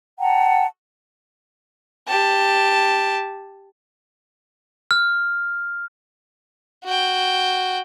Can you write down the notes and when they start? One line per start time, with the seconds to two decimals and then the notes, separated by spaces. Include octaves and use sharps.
0.19 F#5 G5 A5 A#5
2.08 G4 A5
4.91 F6
6.84 F#4 G5